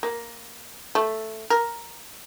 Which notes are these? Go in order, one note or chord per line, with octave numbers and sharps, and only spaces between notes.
A#3
A3
A#4